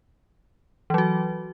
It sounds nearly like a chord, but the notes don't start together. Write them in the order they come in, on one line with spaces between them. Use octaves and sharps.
E3 F#3 F#4